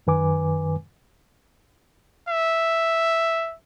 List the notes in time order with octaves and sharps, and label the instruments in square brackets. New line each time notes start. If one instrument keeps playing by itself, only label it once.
[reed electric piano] F#2 D#3 B4 G#5 D6
[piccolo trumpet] E5